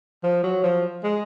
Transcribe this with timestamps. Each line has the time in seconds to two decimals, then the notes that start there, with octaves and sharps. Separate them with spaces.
0.23 F3
0.43 F#3
0.63 F3
1.04 G#3